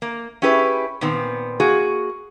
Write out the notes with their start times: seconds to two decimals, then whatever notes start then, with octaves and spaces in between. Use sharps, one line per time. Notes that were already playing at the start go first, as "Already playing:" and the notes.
0.02 A#3
0.42 C#4 E4 G4 G#4 B4
1.01 A#2 D#3 B3 C4
1.60 A#3 F#4 G#4